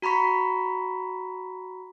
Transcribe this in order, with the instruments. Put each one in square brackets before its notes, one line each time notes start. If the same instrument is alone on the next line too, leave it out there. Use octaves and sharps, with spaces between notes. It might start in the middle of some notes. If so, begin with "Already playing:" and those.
[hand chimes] F#4 A#5 B5 C#6 B6